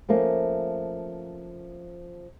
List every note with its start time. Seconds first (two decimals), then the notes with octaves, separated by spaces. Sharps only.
0.09 F3 A3 A#3 C#4